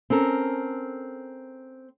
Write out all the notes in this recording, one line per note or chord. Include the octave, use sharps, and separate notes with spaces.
C4 C#4 A4 A#4